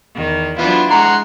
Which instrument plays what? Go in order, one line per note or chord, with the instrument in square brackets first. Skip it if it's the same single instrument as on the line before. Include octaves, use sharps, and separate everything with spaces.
[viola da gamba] E2 D#3
[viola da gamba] F#3 D4 E4 [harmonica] B3 F4
[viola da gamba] G#3 [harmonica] F#5 A#5 C6